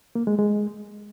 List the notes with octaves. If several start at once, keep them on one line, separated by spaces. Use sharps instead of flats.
A#3
G#3
G#3